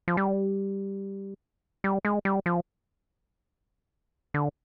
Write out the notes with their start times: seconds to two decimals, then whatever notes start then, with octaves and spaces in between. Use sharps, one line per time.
0.08 F3
0.17 G3
1.84 G3
2.05 G#3
2.25 G3
2.46 F3
4.34 D3